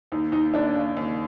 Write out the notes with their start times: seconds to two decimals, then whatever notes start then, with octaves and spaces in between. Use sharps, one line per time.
0.12 D#2 D#4
0.32 D#2 D#4
0.54 D#2 D4
0.75 C#3
0.97 D#2